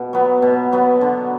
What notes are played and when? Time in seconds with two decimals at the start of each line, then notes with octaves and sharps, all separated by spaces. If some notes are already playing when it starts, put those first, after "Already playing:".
Already playing: B2
0.13 F#3 B3
0.42 B2
0.72 F#3 B3
1.01 D3